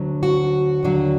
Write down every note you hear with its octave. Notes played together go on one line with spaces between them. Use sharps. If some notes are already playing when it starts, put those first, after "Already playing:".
Already playing: D2 D3 F#3
F#4
D#2 D3 F#3